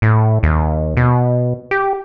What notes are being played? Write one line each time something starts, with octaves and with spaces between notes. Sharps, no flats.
A2
D#2
B2
G4